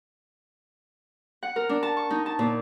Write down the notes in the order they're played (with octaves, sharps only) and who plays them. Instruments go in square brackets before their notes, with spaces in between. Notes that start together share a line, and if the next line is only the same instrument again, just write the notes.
[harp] F#5
A#4
D4
A5
C#6
D#4
A5
A#2